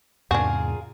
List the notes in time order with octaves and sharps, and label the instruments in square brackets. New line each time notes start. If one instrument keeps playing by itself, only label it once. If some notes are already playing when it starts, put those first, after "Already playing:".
[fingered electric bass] E2 G#2 C3 [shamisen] D4 F#4 [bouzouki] F4 G#4 A#4